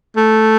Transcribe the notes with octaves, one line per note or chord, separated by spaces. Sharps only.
A3